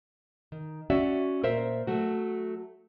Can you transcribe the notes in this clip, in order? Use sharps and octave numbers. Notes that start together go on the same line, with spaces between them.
D#3
C#4 F#4 D5 E5
A#2 A#4 C5 E5
F#3 A3 F#4